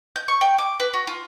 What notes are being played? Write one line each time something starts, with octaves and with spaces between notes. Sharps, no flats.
G6
C#6
G5
D6
B4
F#4
F4